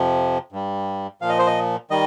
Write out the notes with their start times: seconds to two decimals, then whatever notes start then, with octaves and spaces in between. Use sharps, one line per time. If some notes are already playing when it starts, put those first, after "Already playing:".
Already playing: F2 C3 F3
0.52 G2 G3
1.21 A#2 F3 F5
1.29 D#5
1.39 C5
1.47 D#5
1.91 D#3 G3 D#5